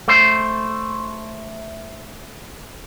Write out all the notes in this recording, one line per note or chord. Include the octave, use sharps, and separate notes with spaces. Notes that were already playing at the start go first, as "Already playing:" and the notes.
A3 C5